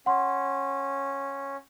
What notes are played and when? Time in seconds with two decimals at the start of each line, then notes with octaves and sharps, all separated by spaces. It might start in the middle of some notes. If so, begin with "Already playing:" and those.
0.06 C#4 F#5 C6